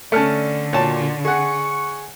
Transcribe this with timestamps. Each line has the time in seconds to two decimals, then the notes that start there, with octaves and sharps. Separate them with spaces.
0.12 D3 A3 C#4 D5 A5 F6 C#7
0.73 A#2 F#4 C#5 A5
1.25 G#4 F#5 C#6